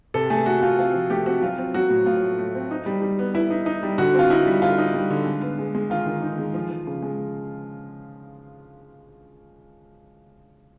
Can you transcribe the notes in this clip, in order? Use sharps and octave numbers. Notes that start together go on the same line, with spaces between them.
C3 A4
A3 G#4
A3 F#4
A3 F4
C4 F4
F3
A3 G4
C4 F#4
F#3 F4
C4
F#3 F#4
A2
A2 F4
A3
A3
C4
D#4
G3
G3
B3
B3 E4
D#4
D#4
G3
D3 F#4
C4 F4
D#4 E4
G3
D3 F4
D#4
G3
D3
G#3
B3
G#3
G#3
D#3 F4
D#3
D#4
G#3
F3
F3
C#3
G#3